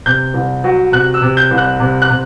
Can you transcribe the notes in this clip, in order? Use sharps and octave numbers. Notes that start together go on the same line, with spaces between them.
C3 G6
C2
F#3
C3 F#6
E6
C3
G6
C2
F#6
C3
F#6
C3